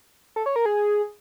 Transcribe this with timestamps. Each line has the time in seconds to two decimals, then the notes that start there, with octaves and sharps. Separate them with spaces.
0.36 A4
0.46 C#5
0.56 A#4
0.66 G#4